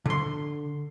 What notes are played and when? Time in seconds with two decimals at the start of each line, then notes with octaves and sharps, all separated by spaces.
0.06 D3 C6